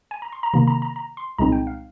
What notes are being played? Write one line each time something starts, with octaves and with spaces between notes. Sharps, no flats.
G#5
A#5
C6
A#5
C3 D#3 A#3 A#5
A#5
A#5
A#5
C6
C2 A#2 G#3 C4 D#4 A#5
G5
F5